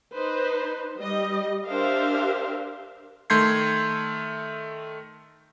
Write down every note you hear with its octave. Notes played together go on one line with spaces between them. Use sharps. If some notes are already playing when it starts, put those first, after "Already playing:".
D#4 B4 C5
G3 D#5
D4 G4 A#4 C5 E5 F5
D#3 A3 C6 G6 G#6 C7